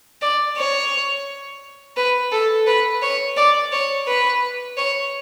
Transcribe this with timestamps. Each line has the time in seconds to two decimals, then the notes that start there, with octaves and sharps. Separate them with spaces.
0.22 D5
0.57 C#5
1.97 B4
2.32 A4
2.67 B4
3.02 C#5
3.37 D5
3.72 C#5
4.07 B4
4.78 C#5